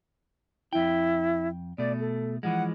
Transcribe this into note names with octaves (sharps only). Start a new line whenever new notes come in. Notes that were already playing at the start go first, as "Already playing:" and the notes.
F2 E4 G5
B2 A3 D5
A4
E3 F3 G#3 F#5